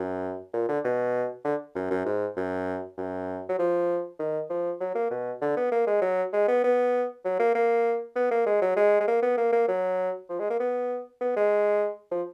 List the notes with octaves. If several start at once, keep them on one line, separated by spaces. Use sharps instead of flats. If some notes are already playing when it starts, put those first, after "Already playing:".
Already playing: F#2
A#2
D3
B2
D3
F#2
F#2
G#2
F#2
F#2
F#3
F3
D#3
F3
F#3
A#3
B2
D3
B3
A#3
G#3
F#3
G#3
B3
B3
F#3
A#3
A#3
B3
A#3
G#3
F#3
G#3
G#3
A#3
B3
A#3
A#3
F#3
F3
G#3
A#3
B3
B3
G#3
F3